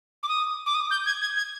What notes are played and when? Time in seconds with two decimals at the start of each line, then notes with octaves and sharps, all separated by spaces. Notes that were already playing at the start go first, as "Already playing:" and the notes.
0.23 D6
0.29 D#6
0.66 D6
0.75 D#6
0.91 G6
1.06 G#6
1.21 G#6
1.37 G#6